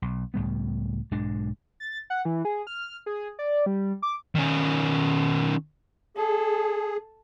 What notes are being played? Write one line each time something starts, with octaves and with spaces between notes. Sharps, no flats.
B1
C#2 A2 G3 B3
B1 G#2 G#3 D4
A6
F#5
E3
G#4
F6
G#4
D5
G3
D6
D#3 C#4
G#4 A4